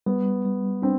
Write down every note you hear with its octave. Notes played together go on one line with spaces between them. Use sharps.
G3 B3
G3
C4 D4